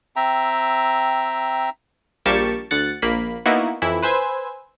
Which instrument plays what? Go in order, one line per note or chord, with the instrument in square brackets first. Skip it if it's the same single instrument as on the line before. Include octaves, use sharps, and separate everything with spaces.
[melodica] C4 E5 G5 A#5
[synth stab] A#1 G3 A#3 G4 A5 C#6
D2 F#5 A6
A#1 A#3 B5
A#3 B3 D#4 E4 F#4
F2 E3 E4
B4 C5 G#5 E6 G#6